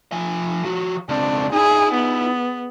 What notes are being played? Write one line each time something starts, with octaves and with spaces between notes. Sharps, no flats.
F3 G#5
F3 F#4
C#2 C4 D4
D#4 E4 G#4
B3